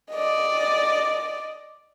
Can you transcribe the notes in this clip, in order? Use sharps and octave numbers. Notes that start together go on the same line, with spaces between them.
D5 D#5